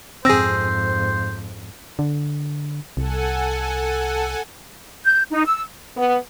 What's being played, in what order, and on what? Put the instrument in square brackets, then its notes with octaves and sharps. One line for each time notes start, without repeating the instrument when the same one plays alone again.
[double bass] F2 G#2 [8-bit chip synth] C4 G#4 [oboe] C5 [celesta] E6 A#6
[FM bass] D3
[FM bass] C2 [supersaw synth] A4 F#5 G#5
[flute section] G6
D#4
E6
[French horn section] B3